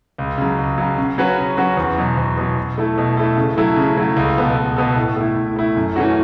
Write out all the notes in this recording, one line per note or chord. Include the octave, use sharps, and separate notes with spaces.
C#2
C#3 F#3
C#2
C#3 F#3
C#3
F#3 C#4 F#4 B4
C#3
F#3 C#4 F#4 B4
E2
B2 F#3
E2
B2 F#3
B2
A3 E4 A4
B2
A3 E4 A4
C#3
F#3 A3 E4 A4
C#3
F#3 A3 E4 A4
C#2
B2 B3 A4
C#2
B2 B3 A4
A2
A3 E4
A2
A3 E4
F#2
E3 A3 C#4 F#4